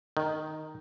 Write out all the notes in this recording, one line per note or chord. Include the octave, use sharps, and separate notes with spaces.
D#3